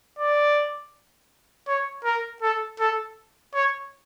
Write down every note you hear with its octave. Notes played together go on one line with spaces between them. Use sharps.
D5
C#5
A#4
A4
A4
C#5